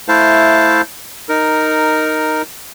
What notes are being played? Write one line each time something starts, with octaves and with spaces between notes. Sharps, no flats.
A3 E4 C5 F5 A5
D#4 A#4